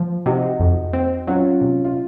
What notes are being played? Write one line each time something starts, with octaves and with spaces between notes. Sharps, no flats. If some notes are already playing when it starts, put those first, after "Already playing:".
Already playing: F3
C3 D#4 F#4
F2
C4
F#3 C#4 F4
C3
F4